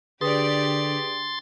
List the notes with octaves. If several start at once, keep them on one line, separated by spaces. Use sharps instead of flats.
D3 G4 G#4 B4 D5 C6 D#6 A6